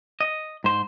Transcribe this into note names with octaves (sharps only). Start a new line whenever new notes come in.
D#5
G#2 C5